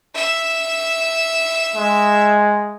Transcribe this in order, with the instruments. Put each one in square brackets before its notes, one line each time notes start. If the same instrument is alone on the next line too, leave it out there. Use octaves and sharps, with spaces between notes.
[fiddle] E5
[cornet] G#3